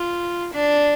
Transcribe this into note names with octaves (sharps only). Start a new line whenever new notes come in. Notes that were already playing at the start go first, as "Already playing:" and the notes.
Already playing: F4
D4